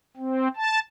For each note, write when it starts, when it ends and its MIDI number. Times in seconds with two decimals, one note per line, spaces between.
0.17 0.48 60
0.56 0.79 81